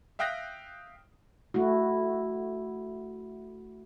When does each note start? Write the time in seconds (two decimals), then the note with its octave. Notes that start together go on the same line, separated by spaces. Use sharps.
0.19 E5 F5 G5 D#6 F#6 A#6
1.54 A3 E4 F#4